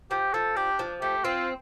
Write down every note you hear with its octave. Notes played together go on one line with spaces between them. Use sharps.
F3 G4
F3 A4
D4 G4
F3
A3 G4
C4 F4